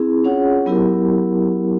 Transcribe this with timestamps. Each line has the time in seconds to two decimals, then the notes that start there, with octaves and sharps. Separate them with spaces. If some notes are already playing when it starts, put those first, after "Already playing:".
Already playing: C4 E4 G#4
0.24 C#4 F4 G#4 C#5 F#5
0.66 F#3 B3 E4 G4 A#4